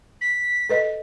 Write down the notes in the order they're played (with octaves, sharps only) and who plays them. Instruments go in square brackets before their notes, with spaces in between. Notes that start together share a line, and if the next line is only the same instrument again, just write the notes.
[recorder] B6
[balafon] A4 B4 D#5